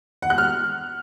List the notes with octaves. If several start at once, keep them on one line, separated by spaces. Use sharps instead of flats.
F#5
F#6
F6